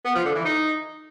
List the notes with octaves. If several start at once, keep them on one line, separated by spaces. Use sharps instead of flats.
B3
F3
D3
E3
D#4